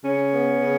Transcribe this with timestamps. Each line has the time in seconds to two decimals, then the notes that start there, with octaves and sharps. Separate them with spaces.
0.05 C#3 C#4
0.34 B3
0.62 C#3